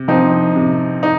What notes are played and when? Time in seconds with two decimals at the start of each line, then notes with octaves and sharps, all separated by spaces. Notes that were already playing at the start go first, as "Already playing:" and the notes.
Already playing: C3
0.08 F3 C4 D#4
0.56 C3
1.03 D#4